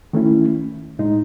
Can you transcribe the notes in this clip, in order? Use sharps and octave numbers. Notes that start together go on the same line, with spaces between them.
D#3 A3 C#4 E4
A2 G#3 D#4